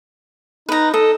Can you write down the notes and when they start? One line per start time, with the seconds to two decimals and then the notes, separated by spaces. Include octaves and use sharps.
0.69 D#4 B4 A#5
0.94 A4 D#5